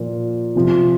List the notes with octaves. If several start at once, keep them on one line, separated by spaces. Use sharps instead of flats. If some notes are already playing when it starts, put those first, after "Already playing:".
Already playing: A#2 F3
C3 F3